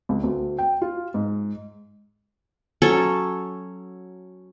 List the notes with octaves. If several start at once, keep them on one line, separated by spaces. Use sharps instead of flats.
C#2
D2
G5
F4
G#2
F#3 C#4 A4 C#5